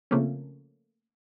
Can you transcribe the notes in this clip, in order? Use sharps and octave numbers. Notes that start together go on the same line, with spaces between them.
C#3 F3 A3 A#3 C4 C#4